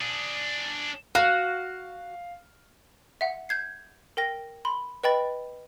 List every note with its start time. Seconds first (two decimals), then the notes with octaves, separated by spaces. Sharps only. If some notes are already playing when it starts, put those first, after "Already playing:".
0.01 D4 G#4
1.15 F#4 F5
3.21 E5 F#5
3.49 G6 G#6 C7
4.17 A#4 G5 A#6
4.65 B5 C6
5.04 B4 D#5 G5 B5 A6